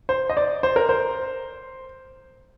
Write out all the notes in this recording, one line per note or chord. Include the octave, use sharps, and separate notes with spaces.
C5
D#5
D5
C5
A#4
C5